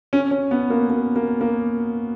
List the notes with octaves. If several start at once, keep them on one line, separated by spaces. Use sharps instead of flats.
C#4
C#4
B3
A#3
A#3
A#3
A#3